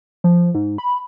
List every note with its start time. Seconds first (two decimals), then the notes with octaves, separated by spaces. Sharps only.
0.24 F3
0.55 G#2
0.78 B5